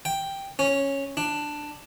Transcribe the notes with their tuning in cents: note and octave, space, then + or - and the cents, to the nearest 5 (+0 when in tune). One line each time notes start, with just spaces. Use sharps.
G5 +0
C#4 -5
D4 +10